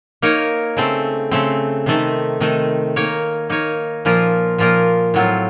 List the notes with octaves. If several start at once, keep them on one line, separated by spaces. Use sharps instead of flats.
A#3 D#4 A#4 C#5
C#3 A3 C4
C#3 A3 C4
C3 D#3 A3 D#4
C3 D#3 A3 D#4
A#3 D#4 A#4 C#5
A#3 D#4 A#4 C#5
A#2 F3 A#3 F4 A#4
A#2 F3 A#3 F4 A#4
A2 F#3 C4 F4